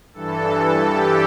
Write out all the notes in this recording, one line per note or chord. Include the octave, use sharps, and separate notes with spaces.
G2 E3 A4
G4